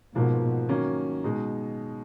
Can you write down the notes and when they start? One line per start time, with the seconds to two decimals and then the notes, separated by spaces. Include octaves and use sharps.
0.15 G#2 B2 F3 A#3
0.69 D#3 F#3 A#3 C#4
1.24 B2 G#3 D#4